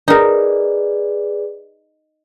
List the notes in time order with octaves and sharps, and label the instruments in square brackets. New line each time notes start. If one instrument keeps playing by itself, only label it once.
[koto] D#4 A#4 [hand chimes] G#4 B4 D5